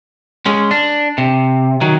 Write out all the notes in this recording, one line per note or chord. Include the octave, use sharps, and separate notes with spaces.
G#3 C#4
D4
C3
D#3 F#3